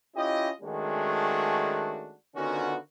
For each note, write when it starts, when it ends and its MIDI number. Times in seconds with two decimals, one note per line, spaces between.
0.16 0.50 61
0.16 0.50 64
0.16 0.50 65
0.16 0.50 67
0.16 0.50 75
0.61 2.15 51
0.61 2.15 56
0.61 2.15 57
0.61 2.15 61
0.61 2.15 62
0.61 2.15 66
2.36 2.76 50
2.36 2.76 51
2.36 2.76 59
2.36 2.76 61
2.36 2.76 65
2.36 2.76 66